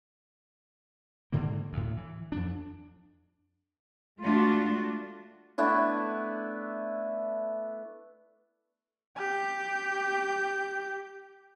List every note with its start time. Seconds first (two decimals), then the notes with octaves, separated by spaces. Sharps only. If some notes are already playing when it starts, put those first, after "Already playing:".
1.32 G#2 D3 D#3 A#3
1.73 D2 A2
1.97 E3
2.32 F2 D4
4.22 G#3 A3 D4 F4 F#4
5.58 A3 B3 D4 E4
9.17 G4 G6